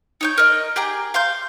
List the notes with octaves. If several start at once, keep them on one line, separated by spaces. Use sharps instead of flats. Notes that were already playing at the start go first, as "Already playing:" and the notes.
D#4 C#5 G6
A#4 D#5
G4 G#4 G5 A#5
F5 C6 G6